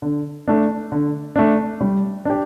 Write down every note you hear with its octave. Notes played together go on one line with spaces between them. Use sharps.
D3
A3 D4
D3
A3 D4
G3
D4 G4